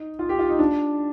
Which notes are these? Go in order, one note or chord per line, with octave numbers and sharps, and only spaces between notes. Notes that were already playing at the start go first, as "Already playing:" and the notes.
Already playing: D#4
F4
G4
F4
D#4
D4